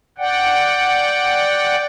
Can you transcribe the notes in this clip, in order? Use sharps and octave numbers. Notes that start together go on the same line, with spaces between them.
D5 F#5 G5